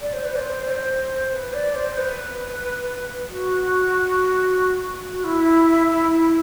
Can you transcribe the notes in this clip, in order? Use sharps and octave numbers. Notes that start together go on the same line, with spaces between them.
D5
C5
B4
D5
C5
D5
C5
B4
D5
C5
B4
F#4
F#4
E4
E4
E4